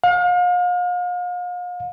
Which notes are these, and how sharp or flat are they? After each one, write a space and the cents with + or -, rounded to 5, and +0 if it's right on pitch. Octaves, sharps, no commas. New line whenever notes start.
F5 +40